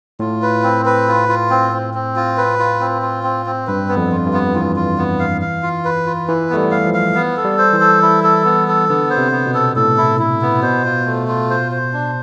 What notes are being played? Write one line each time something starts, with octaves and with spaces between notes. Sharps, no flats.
A2 F4
B4
C4
B4
F4
F4
C4
C4
C4
F4
B4
F4
C4
F4
C4
C4
G2 B4
B3
F2
F4
G2
B3
E3 F4
F4
B3
F5
F5
F4
B4
F4
E3 B4
A3 B3
G3
F5
F3
F5
B3
A4
G3
C5
E3
A4
E4
A4
B3
A4
D3 B3
C5
C3
B3
B2
A4
A2 A4
E4
E4
B3
B2 C5
F4
A3
F4
C5
C5
D4